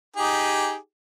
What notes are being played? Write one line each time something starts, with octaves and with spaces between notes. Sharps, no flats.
D#4 G4 G#4